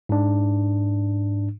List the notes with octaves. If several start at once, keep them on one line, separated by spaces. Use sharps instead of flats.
G#2 D4